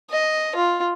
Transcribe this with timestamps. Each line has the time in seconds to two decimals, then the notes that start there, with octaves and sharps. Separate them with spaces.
0.10 D#5
0.56 F4